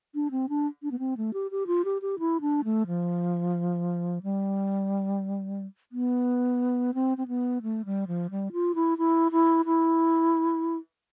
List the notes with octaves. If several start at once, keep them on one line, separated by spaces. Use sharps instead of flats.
D4
C4
D4
D4
B3
C4
A3
G4
G4
F4
G4
G4
E4
D4
A3
F3
G3
B3
C4
C4
B3
A3
G3
F3
G3
F4
E4
E4
E4
E4